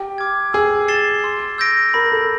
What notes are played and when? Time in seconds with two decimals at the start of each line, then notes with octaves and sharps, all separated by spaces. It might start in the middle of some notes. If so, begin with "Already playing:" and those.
Already playing: G4
0.18 D6 F6 G#6
0.53 G#4 E6
0.88 A6 C7 E7 G7
1.24 C6
1.58 E6 G6 A#6 D7
1.94 A#4 B5
2.12 A4